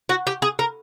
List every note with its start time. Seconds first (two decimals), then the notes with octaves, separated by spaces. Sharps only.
0.09 F#4
0.27 G4
0.42 G#4
0.59 A#4